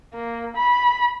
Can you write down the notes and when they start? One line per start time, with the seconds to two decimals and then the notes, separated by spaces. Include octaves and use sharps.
0.14 A#3
0.56 B5